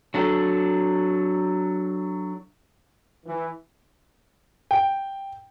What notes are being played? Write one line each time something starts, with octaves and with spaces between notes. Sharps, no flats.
F#3 D4 A4
E3
G5